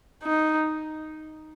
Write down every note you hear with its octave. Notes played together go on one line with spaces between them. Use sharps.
D#4